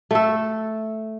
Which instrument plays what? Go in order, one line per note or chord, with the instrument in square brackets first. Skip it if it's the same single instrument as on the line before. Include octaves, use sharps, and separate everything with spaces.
[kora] A3 A4